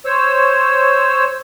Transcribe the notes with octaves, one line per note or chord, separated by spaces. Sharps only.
C5 C#5 E6